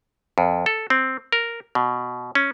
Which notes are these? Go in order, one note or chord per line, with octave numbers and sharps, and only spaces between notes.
F2
A4
C4
A#4
B2
C#4